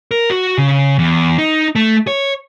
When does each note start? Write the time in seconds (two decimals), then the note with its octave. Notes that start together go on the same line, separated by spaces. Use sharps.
0.11 A#4
0.30 F#4
0.58 C#3
0.99 E2
1.38 D#4
1.75 A3
2.07 C#5